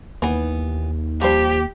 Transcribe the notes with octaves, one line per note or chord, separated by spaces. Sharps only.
D#2 E3 B3
F3 G3 G4 C5